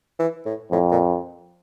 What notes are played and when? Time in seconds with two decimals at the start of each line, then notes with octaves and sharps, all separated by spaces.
0.19 E3
0.45 A2
0.71 F2 A2
0.91 A#2